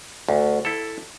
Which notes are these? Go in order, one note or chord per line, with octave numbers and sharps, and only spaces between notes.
D2
E4 A4